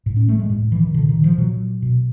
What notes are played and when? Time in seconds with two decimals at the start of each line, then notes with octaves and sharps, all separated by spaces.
0.06 A2
0.17 C#4
0.29 A3
0.39 G#3
0.50 A2
0.72 E3
0.83 D#3
0.94 A#2 D3
1.09 D#3
1.24 F3
1.38 A#2 F#3
1.82 B2